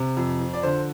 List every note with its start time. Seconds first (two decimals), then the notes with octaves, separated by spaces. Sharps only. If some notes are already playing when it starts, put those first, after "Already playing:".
Already playing: C3
0.17 F2
0.40 F3
0.53 D5
0.63 D3 C5